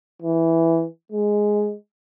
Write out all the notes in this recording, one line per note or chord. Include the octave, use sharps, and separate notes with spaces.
E3
G#3